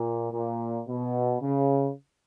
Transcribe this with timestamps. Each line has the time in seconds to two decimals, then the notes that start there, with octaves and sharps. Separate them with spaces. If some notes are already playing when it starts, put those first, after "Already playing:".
Already playing: A#2
0.32 A#2
0.87 B2
1.41 C#3